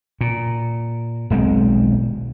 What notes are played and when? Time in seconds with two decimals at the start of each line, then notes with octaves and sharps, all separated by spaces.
0.21 A#2
1.30 D#1 B1 G#3 C4